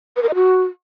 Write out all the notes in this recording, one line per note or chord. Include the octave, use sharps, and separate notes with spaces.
B4
A#4
D#5
F#4